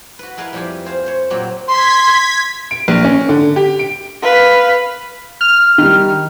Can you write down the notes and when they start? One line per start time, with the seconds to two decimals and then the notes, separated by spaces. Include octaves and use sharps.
0.19 F#4 B4
0.37 E4 G#4 A#4 B4 D#5 F5
0.53 F2 G3 E4 G4 F5 G#5
0.86 G#4 C5 F5 A#5
1.06 C5 C#5
1.30 A#2 F#3 A#3 C4 F#4 G4
1.68 C6 G#6 B6
2.71 D7
2.88 A#1
3.04 C#4
3.29 D3
3.56 G4
3.79 D7
4.23 B4 F5
5.41 F6
5.78 D#3 G3